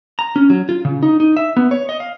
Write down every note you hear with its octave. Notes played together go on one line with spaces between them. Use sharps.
A#5
C#4
F#3
F4
C#3
D#4
D#4
E5
B3
C#5
D#5
F5